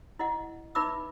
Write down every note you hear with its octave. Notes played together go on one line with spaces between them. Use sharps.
E4 D#5 F#5
D#4 B4 E5 B5 D6 E6